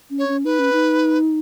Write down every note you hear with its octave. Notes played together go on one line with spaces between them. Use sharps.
C#4
C#5
C#4
D#4 B4
C#4
D#4